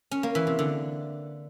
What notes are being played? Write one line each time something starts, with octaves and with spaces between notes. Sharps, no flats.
C#4
A#3
E3
C3
D3